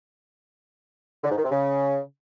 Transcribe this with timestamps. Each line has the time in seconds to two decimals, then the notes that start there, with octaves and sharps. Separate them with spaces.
1.24 D3
1.31 G#2
1.38 D#3
1.44 C3
1.51 C#3